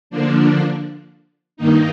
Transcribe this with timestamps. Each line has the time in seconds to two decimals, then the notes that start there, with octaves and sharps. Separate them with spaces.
0.10 D3 F3 A#3 D4
1.57 G2 D#3 A#3 D#4